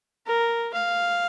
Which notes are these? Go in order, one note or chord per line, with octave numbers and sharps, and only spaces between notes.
A#4
F5